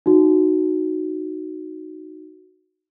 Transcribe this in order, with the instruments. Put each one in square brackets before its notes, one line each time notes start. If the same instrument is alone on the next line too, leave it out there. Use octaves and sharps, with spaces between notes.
[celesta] D#4 F#4